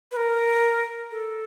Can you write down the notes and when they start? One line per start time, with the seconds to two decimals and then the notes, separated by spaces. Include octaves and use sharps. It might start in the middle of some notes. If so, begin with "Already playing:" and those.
0.11 B4
0.16 A#4
1.11 A4